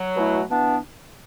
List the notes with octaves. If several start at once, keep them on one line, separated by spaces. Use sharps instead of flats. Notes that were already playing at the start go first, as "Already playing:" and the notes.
Already playing: F#3
B2 A3 E4
E3 B3 D4